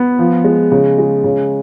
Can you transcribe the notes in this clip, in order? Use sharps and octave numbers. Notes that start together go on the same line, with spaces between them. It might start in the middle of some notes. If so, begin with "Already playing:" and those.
Already playing: B3
F3
G#3
C#3
G#3
C#3